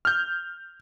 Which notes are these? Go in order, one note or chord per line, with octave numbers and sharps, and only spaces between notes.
F6 G6